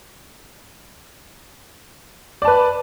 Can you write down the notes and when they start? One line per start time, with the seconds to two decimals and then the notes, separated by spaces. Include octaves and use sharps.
2.42 D5
2.45 A5
2.48 B4